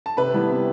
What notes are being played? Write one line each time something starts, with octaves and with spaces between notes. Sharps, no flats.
A5
C3 B4 B5
E3 G3 B3 E4
C3